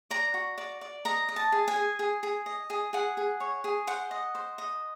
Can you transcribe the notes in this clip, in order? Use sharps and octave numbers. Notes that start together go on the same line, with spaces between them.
D5 A#5
F#4
D5
D5
D#5 A#5
D#5
A5
G#4
G#5
G#4
G#4
G#4
D#5
G#4
G#4 F#5
G#4
C#5
G#4
C5 F#5
D#5
C5
D#5